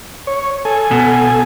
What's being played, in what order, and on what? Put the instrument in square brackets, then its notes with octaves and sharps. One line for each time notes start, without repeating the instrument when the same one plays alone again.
[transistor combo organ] C#5
A4 G#5
[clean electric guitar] B2